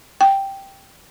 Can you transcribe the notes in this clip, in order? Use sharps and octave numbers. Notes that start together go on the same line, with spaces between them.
G5